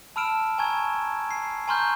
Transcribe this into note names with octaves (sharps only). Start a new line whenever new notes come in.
A5 B5 E6 F6 D7 E7
G#5 A#5 C#6 E6 G#6
G#5 C7
G#5 A#5 C6 C#6 F6 G6